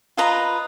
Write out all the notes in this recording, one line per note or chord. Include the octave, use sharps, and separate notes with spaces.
F4 B4 D#5 A#5